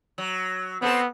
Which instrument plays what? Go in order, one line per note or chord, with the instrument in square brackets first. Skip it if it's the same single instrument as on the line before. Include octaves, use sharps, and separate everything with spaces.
[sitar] F#3
[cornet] B3 [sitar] C4 A4